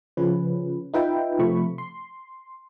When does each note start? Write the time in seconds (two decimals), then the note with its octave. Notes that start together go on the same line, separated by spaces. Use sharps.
0.17 C#3 F3 C#4 B4
0.94 D#4 F4 B4 E5 G5
1.39 C3 F3 A3 B5 C#6
1.78 C6